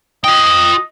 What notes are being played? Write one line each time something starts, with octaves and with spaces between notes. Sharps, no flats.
F4 D#5 G5